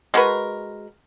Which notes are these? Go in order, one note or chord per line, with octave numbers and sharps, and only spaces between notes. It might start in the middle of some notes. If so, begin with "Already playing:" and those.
G#3 F#4 A#4 B4